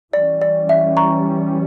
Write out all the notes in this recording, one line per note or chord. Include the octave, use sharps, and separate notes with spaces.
E3 G3 C#4 D5
D5
E5
A#5 C#6